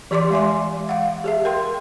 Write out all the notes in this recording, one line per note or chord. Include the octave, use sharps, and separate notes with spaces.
E3 G4 D5 C6 D6
G#3 E5 G#5 C6
F5 F#5
G4 G#4 E5
A#4 G5 C6